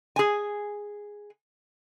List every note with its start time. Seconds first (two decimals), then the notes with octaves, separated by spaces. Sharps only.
0.16 G#4 G#5